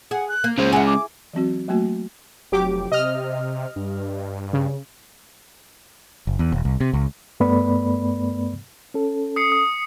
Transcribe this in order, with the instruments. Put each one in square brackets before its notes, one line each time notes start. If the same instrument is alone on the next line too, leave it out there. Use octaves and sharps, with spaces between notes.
[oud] G#4 [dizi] F#5
[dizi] F#6
[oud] A#3
[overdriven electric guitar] C#3 G#3 [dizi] C5
[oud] E4 G#4 [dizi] F#5
[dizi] D6
[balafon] E3 F#3 C4 F#4
F#3 A3 A#3 F#4
[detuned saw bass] F1 [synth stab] F#3 G4 D6
[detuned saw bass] C3 [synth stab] D#5 F6
[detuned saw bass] G2
[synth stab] C#3
[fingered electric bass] F#1
E2
E1
C2
C3
C#2
[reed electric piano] G2 A3 B3 D5 B5
C#4 A4
[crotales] D#6 C7 C#7
D#6